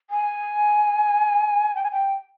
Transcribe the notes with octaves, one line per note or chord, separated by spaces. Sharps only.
G#5
G5
G#5
G5